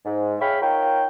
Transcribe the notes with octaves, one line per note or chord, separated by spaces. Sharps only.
G#2
G#4 C#5 E5 F5 G5 B5
D#4 F4 A#4 C#5 G5